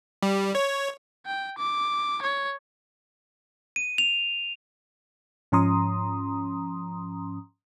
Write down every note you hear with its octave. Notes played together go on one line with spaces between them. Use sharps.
G3
C#5
G5
D6
C#5
D#7
F7
G#2 F3 C#4 A#5 C6 D#6